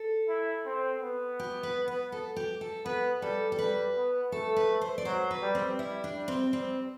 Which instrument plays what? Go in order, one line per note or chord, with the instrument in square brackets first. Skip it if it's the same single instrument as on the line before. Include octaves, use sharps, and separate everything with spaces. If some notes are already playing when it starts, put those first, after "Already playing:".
Already playing: [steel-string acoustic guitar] A4
[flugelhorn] E4
C4
B3
[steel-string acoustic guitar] G4
B4
B4
A4
G4
A4
[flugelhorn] B3 [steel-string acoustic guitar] B4
[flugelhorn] G3 [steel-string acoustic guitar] A4
[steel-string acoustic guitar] A4
[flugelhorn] G3 [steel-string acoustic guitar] B4
[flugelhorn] B3
[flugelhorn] A3 [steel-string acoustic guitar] A4
[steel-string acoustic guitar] B4
C5
D5
[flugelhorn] F#3 [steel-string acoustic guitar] C5
[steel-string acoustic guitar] B4
[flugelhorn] G3
[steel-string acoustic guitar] C4
[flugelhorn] G3 [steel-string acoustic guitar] E4
[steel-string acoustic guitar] D4
[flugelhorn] G3
[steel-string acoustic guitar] C4
[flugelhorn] G3 [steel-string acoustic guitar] C4